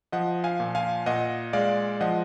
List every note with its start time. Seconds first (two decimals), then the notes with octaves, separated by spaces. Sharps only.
0.12 F3 D#5 F#5
0.44 F5 G#5
0.60 A#2
0.75 F5 G#5
1.06 A#2 D#5 F#5
1.53 G#3 D5 F5
2.01 F3 D#5 F#5